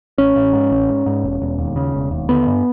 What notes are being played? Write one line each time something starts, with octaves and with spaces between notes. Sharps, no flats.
A1 C#4
A1
G#2
A1
G#2
G#2
E1
E1
D#2
C#3
E1
D#2
D3 B3
G2